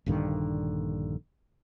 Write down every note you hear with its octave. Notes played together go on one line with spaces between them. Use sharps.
A#1 G2 D3 D#3